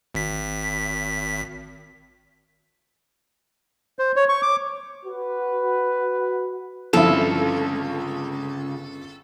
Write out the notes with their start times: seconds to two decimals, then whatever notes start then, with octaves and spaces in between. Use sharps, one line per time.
0.15 G#1 B6
3.99 C5
4.16 C#5
4.29 C#6
4.42 D6
5.04 F#4 B4
6.93 G1 C#3 F3 C4 E4 F4 A4 F5